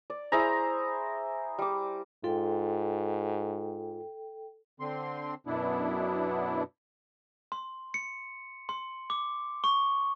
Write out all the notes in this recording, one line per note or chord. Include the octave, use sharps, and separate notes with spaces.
D5
E4 G#4 C5 A#5
G3 D6
G#2 F4 A4 G5
D3 C4 C6
F#2 B2 B3 D4 E4
C6
C#7
C6
D6
C#6